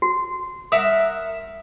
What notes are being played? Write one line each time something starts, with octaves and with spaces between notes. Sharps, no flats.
F#4
A#4 E5 F#5 D#6